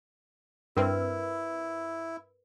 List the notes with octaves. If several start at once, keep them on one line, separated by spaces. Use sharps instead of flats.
G2 C4 E4 A#4 B4